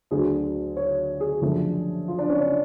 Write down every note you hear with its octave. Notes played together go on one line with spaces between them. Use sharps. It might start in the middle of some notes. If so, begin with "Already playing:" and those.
D2 D3 F#3 A3 G#4
C#5
G#4
F#2 D3 F3 A3
F4
D4
C#4
D4